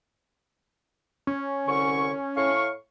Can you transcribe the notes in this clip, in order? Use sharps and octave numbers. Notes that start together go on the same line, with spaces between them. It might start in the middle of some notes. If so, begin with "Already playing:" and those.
C#4
C2 D3 C#6
A2 F5 C#6